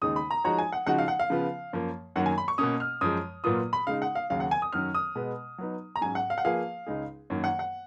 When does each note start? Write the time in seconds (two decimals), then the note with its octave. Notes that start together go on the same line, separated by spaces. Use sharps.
0.02 D#2 C#3 G#3 D#4 D#6
0.16 B5
0.31 A#5
0.44 F3 G#3 D#4 F#4 C#5 A#5
0.58 G#5
0.72 F#5
0.87 C#3 F3 G#3 D#4 F#4 F#5
0.98 F5
1.08 F#5
1.19 F5
1.30 C#3 F3 B3 F4
1.73 F#2 F3 A#3
2.16 F#2 D#3 F#3 A#3 F#5
2.26 G#5
2.38 B5
2.48 C#6
2.58 B2 A#3 C#4 D#6
2.80 F6
3.01 F#2 F3 G#3 D#6
3.44 A#2 F#3 A#3 F4 B4 D#6
3.73 B5
3.87 C#3 G#3 D#4 F5
4.02 F#5
4.15 F5
4.30 D#2 C#3 F#3 F5
4.40 F#5
4.51 G#5
4.62 D#6
4.73 F#2 D#3 F#3 C#4 F6
4.94 D#6
5.15 B2 G#3 B3
5.58 F#3 B3 D#4
5.96 A#5
6.01 G#2 F#3 C#4 G#5
6.15 F#5
6.30 F5
6.38 F#5
6.44 F3 A#3 F4 G#4 B4 F5
6.87 C#2 C#3 G#3 D#4 G#4
7.30 F#2 D#3 F#3 A#3
7.44 F#5
7.59 F#5